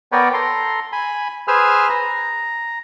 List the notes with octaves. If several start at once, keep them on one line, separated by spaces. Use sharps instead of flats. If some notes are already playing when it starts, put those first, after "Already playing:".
B3 A#4 B4 C#5 D5 G5
A4 A#5 C6
G#5 B5
G#4 B4 C5 G#5 E6 F6
A#5